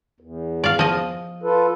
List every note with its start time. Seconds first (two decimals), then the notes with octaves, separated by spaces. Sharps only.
0.20 E2
0.64 D5 F5
0.79 F3 D#5
1.43 F4 A4 B4